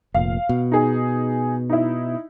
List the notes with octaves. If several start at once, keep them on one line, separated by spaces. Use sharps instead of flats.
F1 A#2 F5
B2
D#4 G#4
D#4 E4